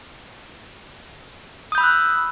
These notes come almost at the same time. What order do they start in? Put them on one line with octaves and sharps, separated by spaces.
D#6 G6 B5 E6 F#6